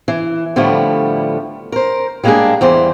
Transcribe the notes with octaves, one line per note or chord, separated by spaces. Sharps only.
E3
A2 D3 F3 G3 A3 B3
A#4 C5
G3 G#3 A#3 B3 D4 G#4
E2 E3 G3 C5